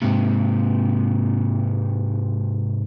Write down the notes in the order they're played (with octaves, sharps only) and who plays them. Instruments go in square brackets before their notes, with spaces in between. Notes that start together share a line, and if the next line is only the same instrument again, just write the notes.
[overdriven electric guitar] G#2 C3